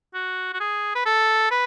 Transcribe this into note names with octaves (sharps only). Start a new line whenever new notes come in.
F#4
F#4
G#4
B4
A4
B4